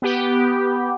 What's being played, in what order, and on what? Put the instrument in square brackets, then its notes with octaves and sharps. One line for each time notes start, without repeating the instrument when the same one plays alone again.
[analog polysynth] B3 G4